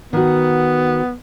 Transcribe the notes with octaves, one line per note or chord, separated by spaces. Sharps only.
D#3 B3 F#4